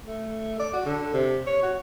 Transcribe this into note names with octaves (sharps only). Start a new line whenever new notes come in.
A3
D5
F#4
D3
C3
C#5
F#4